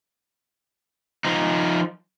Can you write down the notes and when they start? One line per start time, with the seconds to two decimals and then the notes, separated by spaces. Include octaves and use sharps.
1.25 F3 D#4